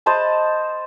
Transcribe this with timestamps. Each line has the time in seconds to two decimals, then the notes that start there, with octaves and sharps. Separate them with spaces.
0.06 C5 D#5 A5 B5